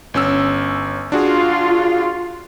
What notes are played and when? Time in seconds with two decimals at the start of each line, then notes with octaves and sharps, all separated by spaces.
0.14 G1 C#4 E6
1.12 D4 F4 F#4 G#4